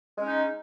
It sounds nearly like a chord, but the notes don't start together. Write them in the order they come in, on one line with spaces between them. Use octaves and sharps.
G#3 C#4 D#4